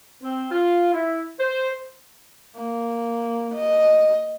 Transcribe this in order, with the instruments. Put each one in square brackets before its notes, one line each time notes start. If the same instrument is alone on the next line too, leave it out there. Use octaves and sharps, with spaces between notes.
[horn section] C4
F4
E4
C5
[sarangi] A#3
D#5